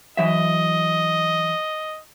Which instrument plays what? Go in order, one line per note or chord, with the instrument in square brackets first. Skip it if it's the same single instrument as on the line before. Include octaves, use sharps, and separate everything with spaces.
[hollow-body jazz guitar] E3 F#3 E5 [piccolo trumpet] D#5